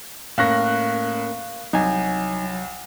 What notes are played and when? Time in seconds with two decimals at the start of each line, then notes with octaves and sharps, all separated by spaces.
0.38 A2 A#3 C#4 A#4 F5 C#6 F#6 A#6
1.73 C2 F#3 D#4 C#5 G#5